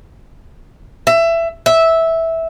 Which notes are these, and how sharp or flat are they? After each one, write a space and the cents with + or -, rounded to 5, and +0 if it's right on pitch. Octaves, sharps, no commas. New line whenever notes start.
E5 +20
E5 -10